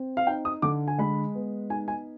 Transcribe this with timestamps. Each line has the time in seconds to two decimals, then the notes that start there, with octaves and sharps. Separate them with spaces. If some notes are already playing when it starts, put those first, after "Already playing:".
Already playing: C4
0.17 F5
0.27 D#4 G5
0.45 D#6
0.62 D3 D6
0.88 G#5
0.98 G#3 B5
1.35 B3
1.70 D#4 G#5
1.88 G#5